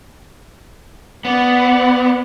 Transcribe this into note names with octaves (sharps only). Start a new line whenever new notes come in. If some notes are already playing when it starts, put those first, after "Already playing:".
B3 D5 F#5